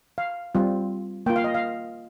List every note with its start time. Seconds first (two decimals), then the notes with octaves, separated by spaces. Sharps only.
0.18 F5
0.55 G3 C4 F4
1.26 A#3 F4 G5
1.36 F5
1.44 D#5
1.54 F5